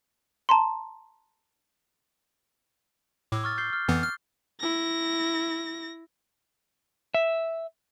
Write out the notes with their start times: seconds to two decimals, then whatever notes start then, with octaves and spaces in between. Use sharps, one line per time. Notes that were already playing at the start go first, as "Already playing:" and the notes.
0.49 A5 A#5 C6
3.32 A2 D6 E6 G#6
3.44 C#6 F6 A6
3.57 G6 C7 G7
3.73 F6
3.88 F2 E3 B3
4.03 F6
4.60 E4 A#6
7.14 E5